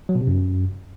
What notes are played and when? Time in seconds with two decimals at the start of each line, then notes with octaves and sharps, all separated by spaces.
0.09 F#3
0.15 B2
0.21 C3
0.27 F#2